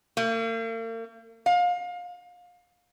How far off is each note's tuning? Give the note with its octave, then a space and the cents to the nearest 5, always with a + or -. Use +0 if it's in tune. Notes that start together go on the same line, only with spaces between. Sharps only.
A#3 -45
F5 +30